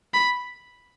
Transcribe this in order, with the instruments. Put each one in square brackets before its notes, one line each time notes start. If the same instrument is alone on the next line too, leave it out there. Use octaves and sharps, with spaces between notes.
[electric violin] B5